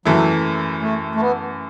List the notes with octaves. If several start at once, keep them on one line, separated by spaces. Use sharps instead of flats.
F#2 E3 F#3 A3 E4
A3
A3
B3